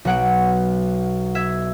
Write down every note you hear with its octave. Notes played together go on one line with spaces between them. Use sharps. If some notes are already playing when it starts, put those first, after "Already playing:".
B1 F#5 D7
E5 G#6